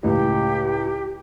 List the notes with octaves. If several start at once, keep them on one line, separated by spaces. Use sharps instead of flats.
C#2 A2 G4